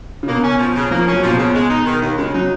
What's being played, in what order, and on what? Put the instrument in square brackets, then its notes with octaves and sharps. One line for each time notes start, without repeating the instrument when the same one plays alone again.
[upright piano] C#3
[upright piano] B2 [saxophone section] A#3
[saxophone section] C#4
F3
C#3
[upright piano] F3 [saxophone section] A#3
[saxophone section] C#4
[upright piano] F#3
[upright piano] A#2 [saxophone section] F3
[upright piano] B2
[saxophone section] C#3
G#3
D#4
D#3
D#2
[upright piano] C#3 [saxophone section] G#3
[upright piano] F#3 [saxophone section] D#4